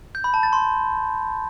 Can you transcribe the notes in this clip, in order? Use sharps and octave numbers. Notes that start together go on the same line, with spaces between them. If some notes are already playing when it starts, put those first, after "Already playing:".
G6
B5
A5
A6
C6